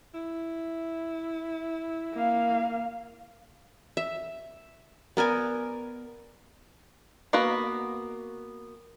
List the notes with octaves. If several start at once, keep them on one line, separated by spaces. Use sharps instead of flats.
E4
A#3 F5
E5
B3 A#4 D5 G#5
A#3 B3 F#4 B4 A#5